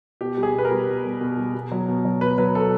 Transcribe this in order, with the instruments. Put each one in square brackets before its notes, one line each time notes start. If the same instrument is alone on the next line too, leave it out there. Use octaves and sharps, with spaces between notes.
[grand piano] B2 G4
G3
G#4
B2 B4
A#4
G3
B2
G3
B2
G3
B2
F#3
B2
F#3
B2 B4
F#3 B4
B2 A4